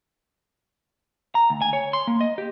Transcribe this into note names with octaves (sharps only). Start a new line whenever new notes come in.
A#5
D2
G#5
C#5
C6
A#3
D#5
G4